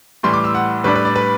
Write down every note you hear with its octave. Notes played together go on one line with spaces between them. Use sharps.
A2 E3 G3 C6
D6
E6
F#5
A2 G3 D4 B4
B4
D5
B4